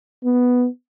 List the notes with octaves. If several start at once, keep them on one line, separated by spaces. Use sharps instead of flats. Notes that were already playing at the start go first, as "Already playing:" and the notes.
B3